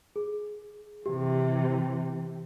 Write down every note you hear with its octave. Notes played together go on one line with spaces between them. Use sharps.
G#4
C3 E3 G4